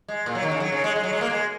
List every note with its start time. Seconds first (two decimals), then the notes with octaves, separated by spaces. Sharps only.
0.08 G#3
0.26 A#2
0.35 F#3
0.43 D#3
0.51 C#3
0.60 F#3
0.72 C#3
0.84 G#3
0.96 G#3
1.04 F#3
1.13 G#3
1.21 A#3
1.30 G#3